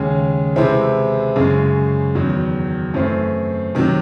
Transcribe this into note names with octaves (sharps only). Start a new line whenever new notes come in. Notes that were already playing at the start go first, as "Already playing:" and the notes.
Already playing: D#2 C#3 G#3 C#4
C3 E3 G#3 C4 E4
F#2 C#3 G#3
E2 D#3 F#3
F#2 E3 A3 C4
C3 D#3 F#3